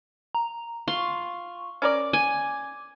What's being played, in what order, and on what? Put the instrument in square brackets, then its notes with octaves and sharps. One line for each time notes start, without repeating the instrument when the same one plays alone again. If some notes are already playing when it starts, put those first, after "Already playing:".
[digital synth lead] A#5
[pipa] F4 [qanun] C6 [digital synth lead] C#6
[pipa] C#4 A#4 D5 [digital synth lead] D6
[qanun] G#5